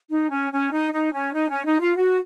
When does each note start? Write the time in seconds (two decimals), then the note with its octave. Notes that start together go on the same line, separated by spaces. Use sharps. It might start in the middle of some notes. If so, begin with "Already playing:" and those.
0.10 D#4
0.30 C#4
0.51 C#4
0.71 D#4
0.93 D#4
1.12 C#4
1.33 D#4
1.50 C#4
1.65 D#4
1.80 F4
1.96 F#4